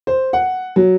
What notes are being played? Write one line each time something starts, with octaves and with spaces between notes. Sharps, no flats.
C5
F#5
F#3